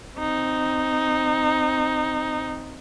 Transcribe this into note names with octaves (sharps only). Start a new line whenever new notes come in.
C4 D#4